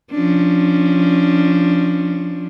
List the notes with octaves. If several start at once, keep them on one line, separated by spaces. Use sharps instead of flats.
F3 C#4 D4